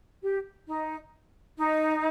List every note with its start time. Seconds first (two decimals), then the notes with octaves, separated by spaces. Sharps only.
0.23 G4
0.68 D#4
1.58 D#4